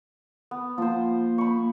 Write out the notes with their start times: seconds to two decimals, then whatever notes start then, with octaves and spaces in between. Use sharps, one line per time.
0.51 B3
0.78 F3 A#3 C5
1.38 B5 C#6